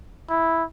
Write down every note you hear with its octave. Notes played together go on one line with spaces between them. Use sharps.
E4